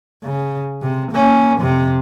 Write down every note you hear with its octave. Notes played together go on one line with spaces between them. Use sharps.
C#3
C3
A#3 C#4
F2 C3